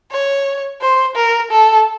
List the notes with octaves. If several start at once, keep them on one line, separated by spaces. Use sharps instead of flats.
C#5
C5
A#4
A4